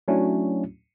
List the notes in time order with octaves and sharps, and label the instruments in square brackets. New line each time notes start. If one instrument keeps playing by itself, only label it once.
[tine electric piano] F#3 A3 C#4 D4 E4 F#4